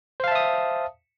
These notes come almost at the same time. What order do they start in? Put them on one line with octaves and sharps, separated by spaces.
C5 F5 A5 E5 D#6